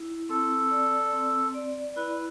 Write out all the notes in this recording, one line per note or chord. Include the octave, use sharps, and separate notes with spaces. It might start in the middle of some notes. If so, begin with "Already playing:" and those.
Already playing: E4
C4 A4
D5
C4
D5
E4 B4